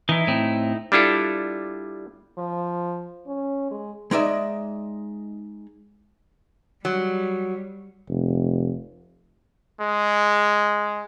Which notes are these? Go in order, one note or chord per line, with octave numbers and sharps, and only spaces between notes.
E3 D#4 E4
A2 C4
G3 D4 E4 F4 A4
F3
C#4
G#3
G#3 D#4 D5 E5
F#3 G3
F1
G#3